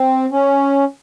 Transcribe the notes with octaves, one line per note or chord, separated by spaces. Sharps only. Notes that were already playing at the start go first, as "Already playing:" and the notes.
Already playing: C4
C#4